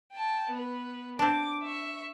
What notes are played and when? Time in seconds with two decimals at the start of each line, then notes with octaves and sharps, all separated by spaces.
0.13 G5 A5
0.51 B3 B4
1.19 C4 D4 D6
1.63 E5 C#6